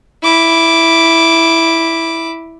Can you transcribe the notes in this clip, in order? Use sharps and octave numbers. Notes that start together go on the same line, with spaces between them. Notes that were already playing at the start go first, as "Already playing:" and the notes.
E4 D6